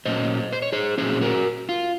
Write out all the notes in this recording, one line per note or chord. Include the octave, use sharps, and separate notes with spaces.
A#2 F#3 C#4 C5 D#5
C5
C#5
G#4 C5
A#2 F#3 C#4 G#4 C5
F#4 A#4
F4